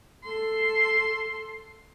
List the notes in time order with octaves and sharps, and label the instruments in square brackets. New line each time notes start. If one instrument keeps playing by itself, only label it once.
[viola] A4 C6